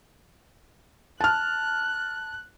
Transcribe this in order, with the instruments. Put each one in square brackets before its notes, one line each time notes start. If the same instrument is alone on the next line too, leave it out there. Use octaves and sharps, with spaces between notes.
[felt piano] A5 F6 [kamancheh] F#6